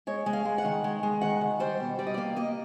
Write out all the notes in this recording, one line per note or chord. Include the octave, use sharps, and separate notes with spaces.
G#3 C#5
G#3
F5
G#3
F#5
D#3
G#3
G#3
D#3 F#5
D#3
G3 C5
B2
G3 D5
D#5
D5
A#3
A#3 D#5